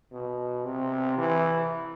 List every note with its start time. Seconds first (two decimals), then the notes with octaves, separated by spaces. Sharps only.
0.12 B2
0.65 C3
1.18 E3